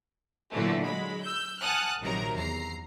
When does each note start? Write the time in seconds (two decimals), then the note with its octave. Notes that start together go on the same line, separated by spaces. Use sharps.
0.52 A#2 D3 E3 F#3 A3
0.84 F#3 G#3 B5
1.24 E6 G6
1.61 F#5 G#5 A5 D#6 F6 F#6
2.01 A#1 C3 D#3 F#3 A#4 A#5
2.34 E2 A#5 C7